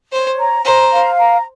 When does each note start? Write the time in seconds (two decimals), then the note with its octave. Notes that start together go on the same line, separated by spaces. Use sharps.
0.12 C5 C#5
0.39 A#5
0.65 C5 A#5
0.93 F5
1.19 A#5